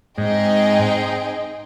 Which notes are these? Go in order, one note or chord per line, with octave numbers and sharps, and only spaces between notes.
G#2 C4 D#4 G#4 D#5 G5